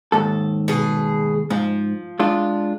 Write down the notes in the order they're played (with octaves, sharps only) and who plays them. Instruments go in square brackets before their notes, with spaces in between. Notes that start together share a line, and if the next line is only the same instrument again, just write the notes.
[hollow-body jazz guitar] D#2 G#2 A4
[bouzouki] B2 G#4
[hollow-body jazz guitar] G#2 [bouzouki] F3
[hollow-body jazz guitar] G#3 D4 F4